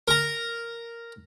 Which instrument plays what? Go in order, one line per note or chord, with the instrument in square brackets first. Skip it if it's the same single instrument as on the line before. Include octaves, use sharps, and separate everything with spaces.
[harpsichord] A#4 A#5